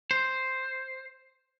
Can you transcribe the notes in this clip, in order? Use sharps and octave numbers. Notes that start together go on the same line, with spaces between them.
C5